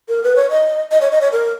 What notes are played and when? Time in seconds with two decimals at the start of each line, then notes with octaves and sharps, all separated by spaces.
0.09 A#4
0.23 B4
0.36 C#5
0.50 D#5
0.91 D#5
1.01 C#5
1.12 D#5
1.21 C#5
1.32 A#4